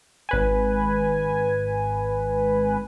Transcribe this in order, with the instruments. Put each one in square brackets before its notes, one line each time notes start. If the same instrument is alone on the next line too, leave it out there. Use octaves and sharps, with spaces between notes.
[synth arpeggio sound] G#1 B4 G#5